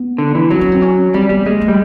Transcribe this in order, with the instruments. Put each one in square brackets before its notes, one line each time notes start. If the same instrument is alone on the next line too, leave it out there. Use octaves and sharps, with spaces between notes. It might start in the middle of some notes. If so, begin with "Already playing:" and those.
Already playing: [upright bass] B3
[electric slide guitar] D3
E3
[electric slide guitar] F#3 [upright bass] C4
[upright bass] C#4
C4
C#4
[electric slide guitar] G3 [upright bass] C4
[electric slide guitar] G3 [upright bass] B3
[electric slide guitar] G#3 [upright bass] A#3
[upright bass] A3
[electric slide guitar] G3